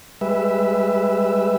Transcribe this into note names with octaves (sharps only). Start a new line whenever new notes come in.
G3 G#3 B4 E5